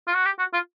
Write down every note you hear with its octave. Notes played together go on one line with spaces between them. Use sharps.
F4
F#4
G4
F#4
F4